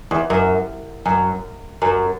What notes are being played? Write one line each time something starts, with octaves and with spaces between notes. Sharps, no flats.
E2
F#2
F#2
F#2